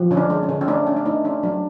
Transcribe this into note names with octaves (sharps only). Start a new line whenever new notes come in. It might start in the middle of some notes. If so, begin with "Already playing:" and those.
Already playing: F3
D3 C#4
D4
G#3
C#4
D3
C#4
A3 D4
C#4
D4
A3 D#4
C#4 D4
F#3 D4